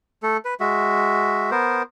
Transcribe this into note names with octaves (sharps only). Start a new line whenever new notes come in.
A3 A4
B4
G#3 F#4 E5
B3 A#4 C5